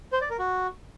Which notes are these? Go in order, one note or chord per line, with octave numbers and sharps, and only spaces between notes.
C5
D5
A#4
F#4